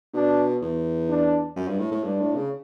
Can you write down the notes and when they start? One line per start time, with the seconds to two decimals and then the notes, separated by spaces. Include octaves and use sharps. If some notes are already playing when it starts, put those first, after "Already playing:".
0.14 B2 D4
0.62 E2
1.09 D4
1.56 F#2
1.68 G2
1.79 A2
1.92 A2
2.03 G2 D4
2.20 A2
2.36 C#3